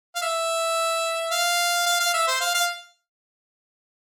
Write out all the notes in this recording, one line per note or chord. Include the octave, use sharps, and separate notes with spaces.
F5
E5
F5
F5
F5
E5
C5
F5
F5